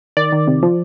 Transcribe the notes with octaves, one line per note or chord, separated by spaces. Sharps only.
D#3 D5
D#3
C3
F3